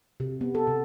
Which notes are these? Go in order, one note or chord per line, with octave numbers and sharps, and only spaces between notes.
C3
B3
A4
C3